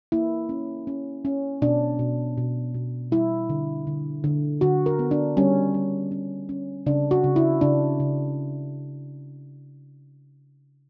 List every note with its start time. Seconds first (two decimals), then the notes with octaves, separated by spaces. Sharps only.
0.12 A#3 E4
0.49 C#4
0.87 C#4
1.25 C#4
1.62 B2 D4
1.99 B2
2.38 B2
2.74 B2
3.11 G3 E4
3.50 D3
3.87 D3
4.24 D3
4.61 D3 F#4
4.86 A#4
4.99 B3
5.11 D4
5.37 G3 C#4
5.74 G3
6.11 C#4
6.49 C#4
6.86 C#3 D4
7.11 F#4
7.24 C#3
7.36 E4
7.61 C#3 D4
8.00 C#3